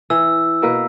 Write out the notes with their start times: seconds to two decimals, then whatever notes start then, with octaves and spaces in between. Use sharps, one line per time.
0.10 E3 E6
0.62 B2 A#3 B4